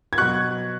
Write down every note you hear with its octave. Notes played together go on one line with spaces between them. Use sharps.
G#6
B2 F#3 C#6 F#6